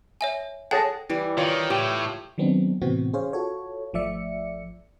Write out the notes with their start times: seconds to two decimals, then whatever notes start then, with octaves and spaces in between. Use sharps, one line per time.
0.21 C#5 E5 G#5
0.71 G#4 A4 C#5 F#5 G5 A5 A#6
1.09 E3 G3
1.38 D#3 F4 C#5
1.70 A2 G4
2.38 D#3 F#3 B3 C4 D4 D#4
2.81 A2 C3 E3 B3 C4 F#4
3.13 C#4 G#4 C5 C#5 F5
3.33 F4 F#4 A4 C#5
3.93 G#1 F3 A3 D5 E5 C#7